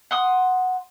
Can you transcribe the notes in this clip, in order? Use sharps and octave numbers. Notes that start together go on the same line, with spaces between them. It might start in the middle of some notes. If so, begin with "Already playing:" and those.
F#5 C6 D#6